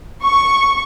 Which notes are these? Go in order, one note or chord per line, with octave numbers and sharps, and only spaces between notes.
C#6